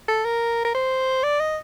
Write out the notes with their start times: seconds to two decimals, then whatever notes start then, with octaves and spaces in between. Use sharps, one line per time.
0.09 A4
0.25 A#4
0.65 A#4
0.75 C5
1.24 D5
1.40 D#5